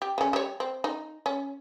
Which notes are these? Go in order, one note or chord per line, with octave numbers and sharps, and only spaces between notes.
G4
C#3 C#4
G3 C#5
C4
D#4
C#4